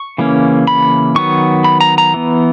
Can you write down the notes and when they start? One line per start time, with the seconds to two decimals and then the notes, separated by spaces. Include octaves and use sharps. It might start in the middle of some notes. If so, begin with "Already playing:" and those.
Already playing: C#6
0.18 C#3 E3 A#3 C#4
0.67 B5
1.15 D#3 F#3 B3 C#6
1.64 B5
1.81 A#5
1.98 A#5
2.14 E3 B3